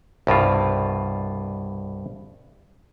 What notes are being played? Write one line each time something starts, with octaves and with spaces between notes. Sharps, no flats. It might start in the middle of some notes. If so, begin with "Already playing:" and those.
C2 G2 B2 F4